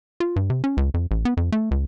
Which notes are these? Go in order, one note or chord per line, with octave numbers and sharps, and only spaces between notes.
F4
G2
C3
C#4
C#2
F2
A1
B3
F2
A3
C#2